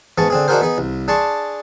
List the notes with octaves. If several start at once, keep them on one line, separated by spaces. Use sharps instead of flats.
G#2 B3 G#4 A5 C#6
D3 C4 G#4
D4 D#4 F#4 G#4 A#4 C5
B3 D#4 G#4
C2
D4 G#4 A5 C6 C#6